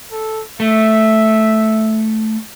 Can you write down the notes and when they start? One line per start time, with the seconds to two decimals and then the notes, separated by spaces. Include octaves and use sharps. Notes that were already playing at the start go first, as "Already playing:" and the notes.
0.12 A4
0.60 A3 E5